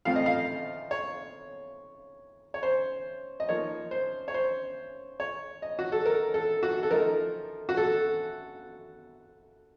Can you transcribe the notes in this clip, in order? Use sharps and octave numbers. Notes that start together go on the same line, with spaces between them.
A2 F3 C4 F5
D#5
F5
C#5
C#5
C5
D#5
F3 A#3 D#4 C#5
C5
C#5
C5
C#5
D#5
F#4
A4
A#4
A4
F#4
A4
F3 A3 D#4 A#4
F#4
A4